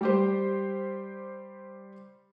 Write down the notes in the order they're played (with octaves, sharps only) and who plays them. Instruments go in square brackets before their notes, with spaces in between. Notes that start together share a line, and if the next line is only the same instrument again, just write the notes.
[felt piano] G3 G4 C5